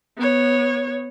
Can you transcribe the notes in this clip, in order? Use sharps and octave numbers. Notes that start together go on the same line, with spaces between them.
B3 C#5